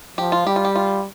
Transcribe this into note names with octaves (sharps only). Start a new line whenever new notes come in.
F3 G4
F4
G3 G4
F4
G4
F4